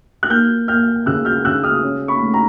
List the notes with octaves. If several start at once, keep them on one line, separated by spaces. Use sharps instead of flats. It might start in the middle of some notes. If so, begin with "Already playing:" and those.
F#6
A#3 F6 G6
A#3 F6 G6
C#3 E6 F#6
F6 G6
C#3 E6 F#6
D#6 F6
C#4
B5 C#6
A3
A#5